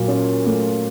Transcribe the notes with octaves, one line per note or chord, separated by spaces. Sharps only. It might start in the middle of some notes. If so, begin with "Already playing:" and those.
Already playing: A#2 F#3
C#4
A3